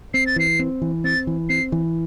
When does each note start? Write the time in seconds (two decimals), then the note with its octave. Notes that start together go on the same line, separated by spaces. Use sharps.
0.14 C4 C7
0.27 A6
0.36 E3 C7
0.59 C4
0.82 E3
1.04 C4 A6
1.27 E3
1.49 C4 C7
1.72 E3